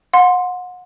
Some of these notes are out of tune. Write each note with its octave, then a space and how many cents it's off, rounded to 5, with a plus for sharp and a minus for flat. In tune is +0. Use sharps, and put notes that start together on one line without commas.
F#5 -35 C6 +0